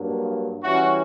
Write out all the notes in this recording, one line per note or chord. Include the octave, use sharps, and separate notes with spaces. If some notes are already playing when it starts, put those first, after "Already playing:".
Already playing: G2 F#3 A#3 D4
E3 G3 C#4 E4 F#4